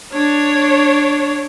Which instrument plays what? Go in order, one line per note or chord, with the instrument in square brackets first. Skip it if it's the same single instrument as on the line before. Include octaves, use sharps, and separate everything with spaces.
[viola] D4 C#5